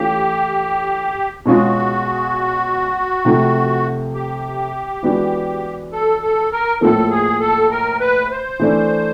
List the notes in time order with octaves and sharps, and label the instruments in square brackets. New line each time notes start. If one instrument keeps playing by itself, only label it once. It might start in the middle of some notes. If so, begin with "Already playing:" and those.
Already playing: [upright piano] E3 A3 C#4 F4 [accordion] G4
[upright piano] B2 G#3 C#4 F4 G#4 [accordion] F#4
[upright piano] C3 F3 A3
[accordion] G4
[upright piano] E3 G#3 B3 D4 F#4
[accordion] A4
A4
A#4
[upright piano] A2 F3 A#3 [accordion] A4
[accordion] G#4
A4
A#4
B4
C5
[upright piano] E3 A3 D4